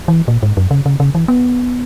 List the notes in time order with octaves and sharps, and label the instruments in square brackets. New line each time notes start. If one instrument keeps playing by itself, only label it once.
[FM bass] E3
A#2
G#2
F#2
C#3
C#3
C#3
E3
B3